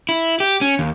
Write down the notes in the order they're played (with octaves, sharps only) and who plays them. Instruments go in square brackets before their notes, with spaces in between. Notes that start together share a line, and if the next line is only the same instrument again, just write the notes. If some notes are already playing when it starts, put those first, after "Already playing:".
[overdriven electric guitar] E4
G4
C#4
D#2